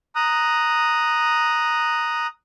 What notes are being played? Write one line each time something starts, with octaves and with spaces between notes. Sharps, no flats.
A#5 D#6 F#6